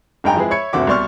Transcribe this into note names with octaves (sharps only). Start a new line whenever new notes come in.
F1 G2 D#4 G5 G#5 A#5
F3 G#3 C4 E4 G#4 B4
C#5 E5 B5 G#6 C#7
F#1 D2 C3 F#4 E5 D6
C2 B2 D5 C6 C#6 F6